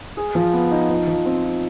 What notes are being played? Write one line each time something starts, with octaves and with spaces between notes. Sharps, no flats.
G#4
F3
B3
D#4
F3
F3
C4
F4